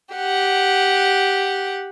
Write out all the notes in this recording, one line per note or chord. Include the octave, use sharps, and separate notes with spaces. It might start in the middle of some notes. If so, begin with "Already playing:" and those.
G4 F#5